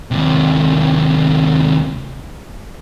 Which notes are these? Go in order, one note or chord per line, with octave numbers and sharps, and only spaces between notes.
D#2 C3